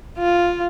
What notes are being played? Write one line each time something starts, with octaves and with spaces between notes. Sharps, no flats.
F4